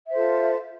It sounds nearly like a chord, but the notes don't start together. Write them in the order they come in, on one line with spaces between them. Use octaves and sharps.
E5 C5 A4 F4